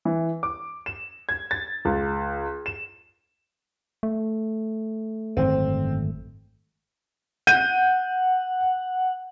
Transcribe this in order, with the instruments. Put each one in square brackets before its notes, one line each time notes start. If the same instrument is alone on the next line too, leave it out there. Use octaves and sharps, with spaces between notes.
[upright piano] E3
D6
E7
G#6
A6
C#2
E7
[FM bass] A3
[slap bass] G#1 F#2 D3 [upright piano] C4
[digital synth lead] F#5 [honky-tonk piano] G6 D#7